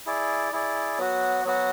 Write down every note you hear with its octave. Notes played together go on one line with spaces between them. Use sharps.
E4 G#4 D5
E4 G#4 D5
F#3 B3 F#4
F#3 B3 F#4